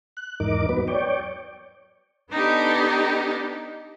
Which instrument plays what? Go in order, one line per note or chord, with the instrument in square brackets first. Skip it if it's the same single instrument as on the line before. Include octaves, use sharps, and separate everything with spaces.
[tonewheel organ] F#6
E2 G#2 D#4 A#4 D6
F#3 B3 B4
C#5 D5 G5
[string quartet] B3 D4 D#4 G4 A4